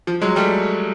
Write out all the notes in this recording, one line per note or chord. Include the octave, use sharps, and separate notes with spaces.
F3
F#3 G#3
G3 A3